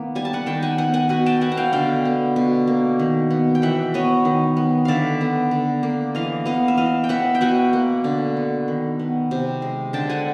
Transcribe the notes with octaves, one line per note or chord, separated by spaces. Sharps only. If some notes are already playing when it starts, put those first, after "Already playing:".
Already playing: D#3 A#3 B3
G3 G#5
A5
F#5 G#5
D#3 G5 A5
F#5 G#5
B3 F#5 G#5
F#5 G#5
B2 F#5 G#5
G5 A5
B3 F#5 G#5
F#5
F5 G5
D3 F5 G5
B3
B2
A#3
D#3
B3
G5
E3 E5 F#5
B3 C#5 D#5
D#3
B3
D3 D5 E5 F5
B3
D3
A#3
E3 D#5 F5
B3 D#5 F5
E5
E3 D#5 F5
G5
B3 E5 F#5
G5
B2 F#5 G#5
A#3
D3
B3
D#3
B3
C3
G#3
D3 G5 A5
F#5 G#5